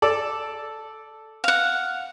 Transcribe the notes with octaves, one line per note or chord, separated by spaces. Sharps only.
A4 D5
F5 F#5